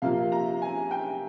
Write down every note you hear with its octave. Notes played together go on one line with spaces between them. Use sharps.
C3 F3 A#3 F5
A#5
G#5
G5